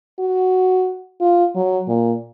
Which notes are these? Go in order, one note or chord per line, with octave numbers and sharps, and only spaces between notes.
F#4
F4
F#3
A#2